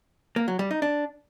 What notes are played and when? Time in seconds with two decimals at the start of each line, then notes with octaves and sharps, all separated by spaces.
0.36 A#3
0.48 F#3
0.59 G3
0.71 D#4
0.82 D4